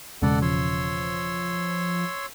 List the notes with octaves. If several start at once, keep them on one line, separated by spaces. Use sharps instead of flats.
E1 C#3 G#3 A4 D5 F#5
F3 C#5 C6 E6